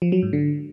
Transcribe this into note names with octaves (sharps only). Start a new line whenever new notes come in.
F3
F#3
G#2
D3